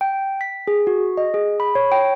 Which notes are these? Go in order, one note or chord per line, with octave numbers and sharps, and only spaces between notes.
G5
B6
G#4
F#4
D#5
G#4
B5
C#5
G5